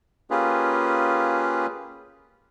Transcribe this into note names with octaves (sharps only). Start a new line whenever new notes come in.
A#3 C#4 F4 G4 G#4 B4